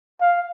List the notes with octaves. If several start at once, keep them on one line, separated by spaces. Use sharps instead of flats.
F5